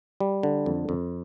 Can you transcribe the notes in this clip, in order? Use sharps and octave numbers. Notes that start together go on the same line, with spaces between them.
G3
D3
F2
F2